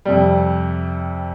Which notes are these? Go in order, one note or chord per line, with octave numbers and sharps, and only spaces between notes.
F2 C3 G3